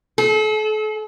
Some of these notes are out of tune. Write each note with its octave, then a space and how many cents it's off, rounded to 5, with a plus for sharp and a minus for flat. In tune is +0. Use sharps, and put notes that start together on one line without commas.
A4 -40